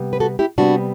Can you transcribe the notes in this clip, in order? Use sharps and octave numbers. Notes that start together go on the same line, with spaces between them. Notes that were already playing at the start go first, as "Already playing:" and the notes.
Already playing: C3 G3 B3
B4
F#4 A4
E4 G4
C3 G3 B3 D4 F#4